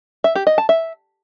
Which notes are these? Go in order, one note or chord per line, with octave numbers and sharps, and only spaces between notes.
E5
G4
D#5
A5
E5